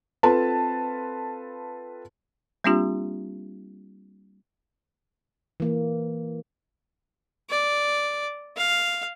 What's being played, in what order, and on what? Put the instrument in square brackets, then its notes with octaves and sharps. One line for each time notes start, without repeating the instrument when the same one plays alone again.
[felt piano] C4 F4 A4 B4 A5
[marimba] G3 A#3 C4 D4 F4 G4
[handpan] E3 A#3
[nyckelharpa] D5
F5